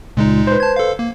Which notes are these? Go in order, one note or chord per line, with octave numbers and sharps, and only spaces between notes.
C#2 A#2 G#3 D#4
B4 C5
A5 G#6
A4 F5
A#3